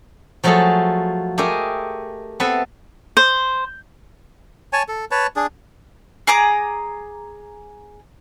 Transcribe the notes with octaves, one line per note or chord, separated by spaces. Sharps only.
F3 F#3 A3 F4 G#4 A4
A3 G4 G#4 A#4 D#5
B3 C4 A4 B4 E5
C5
C#5 G#5 A5
A4
B4 C#5 A5
D4 G#4
G#4 A#5 D6 D#6